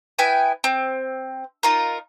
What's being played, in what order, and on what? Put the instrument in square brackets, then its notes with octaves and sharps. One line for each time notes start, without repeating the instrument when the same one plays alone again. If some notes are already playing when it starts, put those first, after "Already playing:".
[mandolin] B3 E4 G5 G#5
C4
D#4 F4 A#4